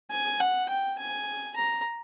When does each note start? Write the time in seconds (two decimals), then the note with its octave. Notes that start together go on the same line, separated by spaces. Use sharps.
0.11 G#5
0.40 F#5
0.69 G5
0.98 G#5
1.56 A#5